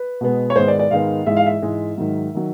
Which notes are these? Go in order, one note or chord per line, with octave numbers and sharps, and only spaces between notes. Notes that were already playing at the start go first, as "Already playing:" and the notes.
Already playing: B4
B2 G#3 B3
C#5
G#2 D#3 G#3 B3 C5
D5
D5
G#2 D#3 G#3 B3 F5
G#2 E3 G#3 E5
F5
E5
G#2 E3 G#3
G#2 D#3 F#3
D#3 F#3